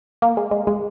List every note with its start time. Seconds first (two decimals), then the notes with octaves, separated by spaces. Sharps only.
0.22 A#3
0.37 G#3
0.51 G#3
0.67 G#3